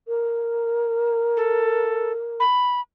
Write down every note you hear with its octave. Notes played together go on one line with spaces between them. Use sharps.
A#4
A4
B5